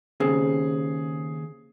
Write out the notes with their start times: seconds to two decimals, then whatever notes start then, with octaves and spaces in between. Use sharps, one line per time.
0.20 D#2 C#3 C4 G#4